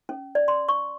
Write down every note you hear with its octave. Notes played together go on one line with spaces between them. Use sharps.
C#4
D5
C6
C#6